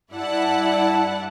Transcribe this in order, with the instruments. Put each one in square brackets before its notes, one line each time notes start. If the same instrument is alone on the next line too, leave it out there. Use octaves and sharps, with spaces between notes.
[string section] G2 E4 D5 F#5 A5